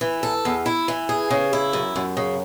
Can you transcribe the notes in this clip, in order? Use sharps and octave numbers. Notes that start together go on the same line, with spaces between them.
E3
A4
E2
E4
E3
G#4
C#3
E4
F#2
F#2
C#3